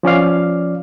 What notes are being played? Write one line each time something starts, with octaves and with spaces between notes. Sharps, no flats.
F3 C#4 D5 F5